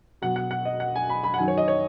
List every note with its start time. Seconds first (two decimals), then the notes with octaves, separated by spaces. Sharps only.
0.22 B2 F#3 F#5
0.36 F#5
0.51 F#5
0.65 D#5
0.80 F#5
0.95 G#5
1.09 B5
1.23 B5
1.34 F#5
1.38 F#2 D#3 F#3 G#5
1.48 C#5
1.58 D#5
1.68 C#5